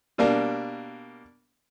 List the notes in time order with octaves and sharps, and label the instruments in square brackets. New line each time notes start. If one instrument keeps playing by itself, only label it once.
[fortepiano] B2 G3 A#3 D4